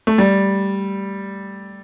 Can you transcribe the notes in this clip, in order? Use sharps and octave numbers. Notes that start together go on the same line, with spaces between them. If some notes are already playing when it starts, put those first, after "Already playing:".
A3
G3